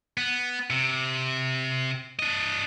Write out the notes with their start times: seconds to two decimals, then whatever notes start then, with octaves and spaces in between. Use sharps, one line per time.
0.18 B3
0.70 C3
2.19 D4 D#5